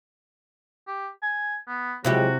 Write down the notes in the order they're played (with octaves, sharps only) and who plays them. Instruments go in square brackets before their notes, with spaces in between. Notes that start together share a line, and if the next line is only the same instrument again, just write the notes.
[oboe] G4
G#5
B3
[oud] C3 E4 G4 [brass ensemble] F3 F#3 G#3 [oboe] F#4